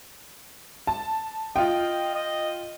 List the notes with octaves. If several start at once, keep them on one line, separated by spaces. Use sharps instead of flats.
A5
F4 D#5 G5
D#5